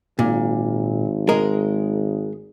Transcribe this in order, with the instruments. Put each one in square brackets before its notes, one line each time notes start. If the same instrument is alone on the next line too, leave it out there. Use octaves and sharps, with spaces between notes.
[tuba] G#1 [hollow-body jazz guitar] A#2
[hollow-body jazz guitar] G#3 A#4